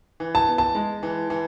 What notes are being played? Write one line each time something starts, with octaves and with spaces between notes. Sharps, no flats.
E3
A5
B3
A5
G#3
E3
E3